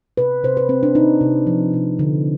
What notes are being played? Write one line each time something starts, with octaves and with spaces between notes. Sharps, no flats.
C3 B4
C3 C5
B4
C3 C4
D4
C3 D#4
C3
F3
C3
D3